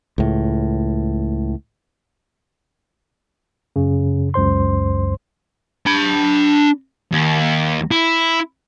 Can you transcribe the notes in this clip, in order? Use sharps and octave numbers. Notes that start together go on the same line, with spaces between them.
C#2 A2
F#2 C#3
C#2 F#2 C5 C6
D4 B5
D#2
E4